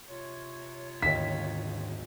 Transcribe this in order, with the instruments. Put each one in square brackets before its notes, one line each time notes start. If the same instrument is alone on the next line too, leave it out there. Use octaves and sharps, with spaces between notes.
[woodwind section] C3 F4 C#5
[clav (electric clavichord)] D#2 E5 [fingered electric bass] G#2 D3 D#3 [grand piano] B6